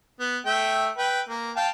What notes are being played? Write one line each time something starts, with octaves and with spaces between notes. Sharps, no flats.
B3
A3 E5 G5
B4 G5
A#3
F5 G5 A5